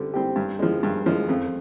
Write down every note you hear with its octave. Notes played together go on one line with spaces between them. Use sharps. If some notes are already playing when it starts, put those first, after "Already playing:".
Already playing: D3 G3 C4 G4
G3 C4 G4
G2
F3 G#3
G2
F3 G#3
F2